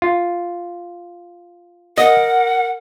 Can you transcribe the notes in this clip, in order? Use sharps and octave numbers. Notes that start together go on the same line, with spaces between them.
F4
A#4 D#5 F#5